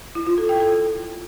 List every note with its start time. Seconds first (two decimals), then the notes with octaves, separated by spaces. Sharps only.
0.15 E4
0.27 F4
0.38 A4
0.49 G5
0.60 A4